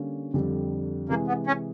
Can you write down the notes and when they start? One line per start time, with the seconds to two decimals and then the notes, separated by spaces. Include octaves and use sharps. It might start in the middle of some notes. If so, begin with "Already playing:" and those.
Already playing: D3 G3 A#3 C#4
0.34 F2 D3 G3
1.09 C3 E3 G#3 A#3
1.28 B3
1.47 C#4